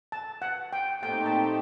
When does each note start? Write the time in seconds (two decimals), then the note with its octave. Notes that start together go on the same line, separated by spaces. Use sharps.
0.12 A5
0.42 F#5
0.73 G5
1.03 A#2 A3 C4 D#4 G4 G5
1.26 A5